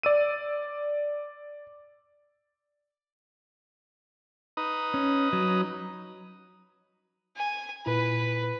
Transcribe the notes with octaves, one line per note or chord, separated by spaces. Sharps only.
D5 E6 D#7
D#4 B4 D#6
C#4
F#3
G#5
A#2 E4 B4